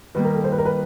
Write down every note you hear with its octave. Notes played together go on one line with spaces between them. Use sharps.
D#3 G3 A#3 B4
A#4
A4
C5
B4
A#4
B4